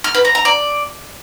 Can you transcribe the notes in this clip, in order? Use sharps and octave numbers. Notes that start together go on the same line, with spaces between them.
F6
B4
A#5
A#5
D5